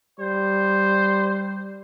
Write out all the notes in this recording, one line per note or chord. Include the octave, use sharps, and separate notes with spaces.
G3 C5